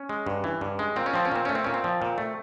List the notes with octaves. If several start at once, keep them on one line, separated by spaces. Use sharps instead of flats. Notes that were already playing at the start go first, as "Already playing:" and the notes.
Already playing: C#4
G#3
G2
E3
G2
G#3
A#2 C4
C#4
F3 C4
C#4
A#2 C4
A3 C#4
C4
A#2 C#4
C4
F3
A#2
A3